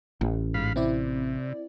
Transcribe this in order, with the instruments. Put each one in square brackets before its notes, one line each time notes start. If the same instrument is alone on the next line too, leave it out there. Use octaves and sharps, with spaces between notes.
[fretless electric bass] A1
[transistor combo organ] G#2 F5 B5
[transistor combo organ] C3 [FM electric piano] C4 E4 D5